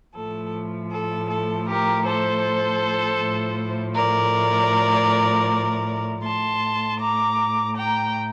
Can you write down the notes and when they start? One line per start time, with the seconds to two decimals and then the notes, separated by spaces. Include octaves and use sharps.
0.14 A2 F3 A3 A4
0.91 A4
1.29 A4
1.67 G4 A#4
2.05 A4 C5
3.20 A2 F3 A3
3.95 A#4 D5
6.24 A2 A3 A5 C6
7.00 A#5 D6
7.76 G5 A#5